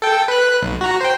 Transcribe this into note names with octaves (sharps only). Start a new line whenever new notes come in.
A4 G5
B4 F#6
B1
F#4 A#5
C5 G5